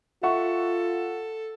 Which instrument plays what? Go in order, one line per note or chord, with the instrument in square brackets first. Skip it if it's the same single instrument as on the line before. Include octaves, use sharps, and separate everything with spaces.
[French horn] F4 [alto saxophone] A4 [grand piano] E5 F#5 C#6